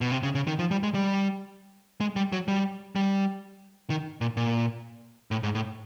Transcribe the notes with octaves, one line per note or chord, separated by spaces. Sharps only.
B2
C3
C#3
C#3
D#3
F3
G3
G#3
G3
G#3
G3
F#3
G3
G3
D#3
A#2
A#2
A2
G#2
A2